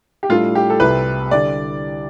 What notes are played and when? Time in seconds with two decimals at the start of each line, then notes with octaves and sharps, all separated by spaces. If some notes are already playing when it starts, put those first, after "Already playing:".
0.23 G4
0.29 A2 G3 D4 F4 A4
0.55 G4
0.70 A4
0.80 C2 C3 G3 B4
1.31 D3 G3 D5